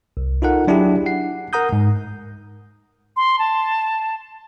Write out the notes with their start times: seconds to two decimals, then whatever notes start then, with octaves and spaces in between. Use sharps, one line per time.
0.17 C2
0.42 D#4 F4 A4 A#4 F#5
0.67 F#3 D4 E4 G4 G#4
1.06 F#5 C7
1.53 A#4 F#5 A#5 D#6 G6
1.73 G#2
3.16 C6
3.39 A5